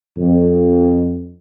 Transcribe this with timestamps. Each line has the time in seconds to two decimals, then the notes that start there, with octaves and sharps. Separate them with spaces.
0.18 F2